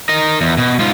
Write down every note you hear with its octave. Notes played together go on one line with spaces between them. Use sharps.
A#4 D#5
E2
B2
G#2 F4